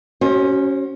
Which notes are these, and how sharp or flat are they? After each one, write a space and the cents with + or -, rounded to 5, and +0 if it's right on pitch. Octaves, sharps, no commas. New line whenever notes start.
C#4 +0 F#4 +35 C5 +35